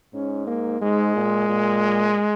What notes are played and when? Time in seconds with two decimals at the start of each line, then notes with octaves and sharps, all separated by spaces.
0.14 G#2 C#4
0.47 A#3
0.81 G#2 G#3
1.15 A#2
1.49 A#2